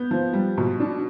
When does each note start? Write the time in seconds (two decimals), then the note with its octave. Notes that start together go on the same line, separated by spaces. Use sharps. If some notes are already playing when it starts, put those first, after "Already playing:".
Already playing: B3 G6
0.11 F3
0.33 G3
0.58 B2
0.80 D4